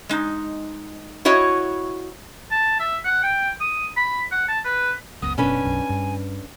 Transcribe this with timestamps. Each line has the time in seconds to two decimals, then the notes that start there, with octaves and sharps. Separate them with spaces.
0.09 G#3 D#4
1.25 E4 F#4 C#5 D#5
2.51 A5
2.80 E5
3.05 F#5
3.23 G5
3.61 D#6
3.97 B5
4.32 F#5
4.48 A5
4.65 B4
5.22 F#1 C#2 B3 D#6
5.38 F#1 B2 C#4 D4 B4 G#5
5.64 B1 F#2
5.89 G2